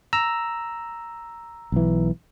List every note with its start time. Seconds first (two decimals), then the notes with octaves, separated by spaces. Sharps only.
0.13 A#5 E6
1.72 B1 E3